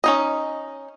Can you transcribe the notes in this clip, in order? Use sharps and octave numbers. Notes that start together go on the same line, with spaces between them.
C#4 D#4 D#5